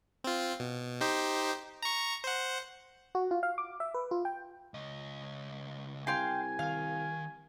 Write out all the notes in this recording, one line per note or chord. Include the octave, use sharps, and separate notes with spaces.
C4 F4
B2
D#4 G4 C5
A#5 C#6
C5 F#5
F#4
F4
F5
D6
E5
B4
F4
G5
C#2 D#5
C2 F5 G5 G#5 C6
D#3 F5